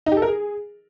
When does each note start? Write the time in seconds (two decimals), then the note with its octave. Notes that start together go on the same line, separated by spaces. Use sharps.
0.06 D#4
0.12 G4
0.17 A4
0.22 A#4
0.27 G#4